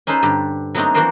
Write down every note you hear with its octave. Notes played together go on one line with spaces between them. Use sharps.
C#4 D#4 A4 B4 C5
G2 D3 G4
F#3 A3 B3 C4 D4 D#4
E3 A#3 D4 F#4 A#4 C5